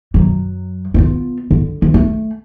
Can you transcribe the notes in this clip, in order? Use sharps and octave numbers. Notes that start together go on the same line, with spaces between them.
F#2 F#3
B3 F4
D3
E3
A3